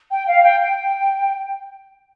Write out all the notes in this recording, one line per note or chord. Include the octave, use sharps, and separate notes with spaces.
G5
F5
G5
G5